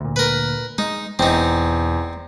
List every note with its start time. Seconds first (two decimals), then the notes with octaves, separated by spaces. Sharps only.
0.01 D2 A#2
0.16 A#4 B4
0.78 G#3 D#4
1.19 E1 E2 C4 D#4